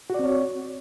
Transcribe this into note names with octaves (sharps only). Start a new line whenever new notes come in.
C4 F#4 C#5 D5